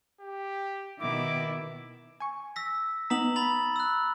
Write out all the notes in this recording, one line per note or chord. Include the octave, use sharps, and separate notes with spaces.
G4
B2 D#3 E4 D6
G#5 C#6
E6 A#6 B6
B3 D#4 A#5 D#6 B6 F#7
B5 A6 F#7
E6 F#6